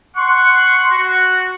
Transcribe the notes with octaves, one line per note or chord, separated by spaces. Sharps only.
F#5 C6 C#6
F#4